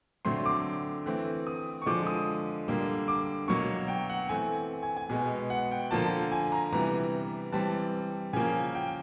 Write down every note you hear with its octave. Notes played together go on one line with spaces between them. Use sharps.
D3 F#3 A3 C4 C6
D6
E3 A3 C4
D#6
C#6
D3 F3 G#3 D6
D#6
D3 G3 A#3
D6
B2 F#3 A#3 C#6
G5
F#5
E3 A3 C4 G#5
G#5
G#5
B2 G#3 B3
F#5
G5
D3 F3 A#3 A5
G#5
A#5
C3 E3 G3 B3 A#5
E3 G3 C4 A5
C#3 F3 A#3 G#5
G5